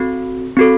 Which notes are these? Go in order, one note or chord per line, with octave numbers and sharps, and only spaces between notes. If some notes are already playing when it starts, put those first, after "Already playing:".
Already playing: C4 F#4 A4
C4 F#4 A4